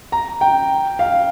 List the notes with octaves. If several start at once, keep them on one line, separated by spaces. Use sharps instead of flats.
A#5
G5
F5